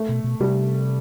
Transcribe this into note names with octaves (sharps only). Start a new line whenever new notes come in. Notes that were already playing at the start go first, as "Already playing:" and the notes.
Already playing: A3
B2
B2
C3 G3